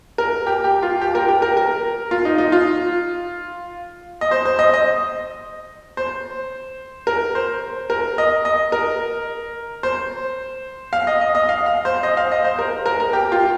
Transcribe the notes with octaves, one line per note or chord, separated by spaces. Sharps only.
A#4
G4
G4
F4
G4
A#4
G4
A#4
A#4
F4
D#4
D#4
F4
D#5
C5
C5
D#5
D#5
C5
A#4
C5
A#4
D#5
D#5
A#4
C5
F5
D#5
D#5
D#5
F5
F5
C5
D#5
F5
D#5
C5
A#4
A#4
A#4
G4
F4